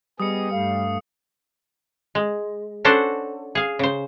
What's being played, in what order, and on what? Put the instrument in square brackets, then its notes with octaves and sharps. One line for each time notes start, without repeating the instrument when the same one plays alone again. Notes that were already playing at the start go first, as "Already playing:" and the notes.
[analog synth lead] G3 [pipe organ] B3 G#4 D#5 [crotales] D#6 C#7
[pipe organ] G2 A3 [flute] F5
[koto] G#3
C#4 D4 F#4 A4 C5
G#4 F5
C#3 C5